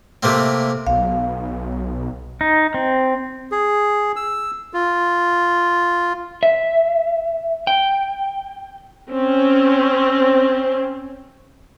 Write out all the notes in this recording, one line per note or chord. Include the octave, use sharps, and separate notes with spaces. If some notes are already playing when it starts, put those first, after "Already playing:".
C3 A3 A#3 C4
B1 F5
D#4
C4
G#4
E6
F4
E5
G5
C4 C#4